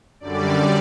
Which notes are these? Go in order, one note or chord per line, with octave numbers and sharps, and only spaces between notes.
F#2 D3 G3 D5